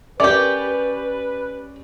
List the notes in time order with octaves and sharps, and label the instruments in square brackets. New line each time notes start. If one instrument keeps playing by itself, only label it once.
[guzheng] C#4 G4 [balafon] A#4 E5 D6 [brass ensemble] B4 [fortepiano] D5